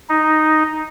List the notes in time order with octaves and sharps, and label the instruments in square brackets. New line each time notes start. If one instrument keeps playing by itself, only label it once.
[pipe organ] D#4